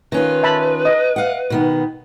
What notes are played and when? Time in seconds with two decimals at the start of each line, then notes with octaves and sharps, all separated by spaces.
0.12 D#3 C#4 F4 B4
0.43 E5 A5 B5
0.85 D#5
1.16 F5 F#5
1.50 B2 D#3 B3